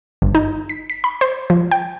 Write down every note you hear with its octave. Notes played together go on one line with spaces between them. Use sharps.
G1
D#4
B6
B6
B5
C5
F3
G5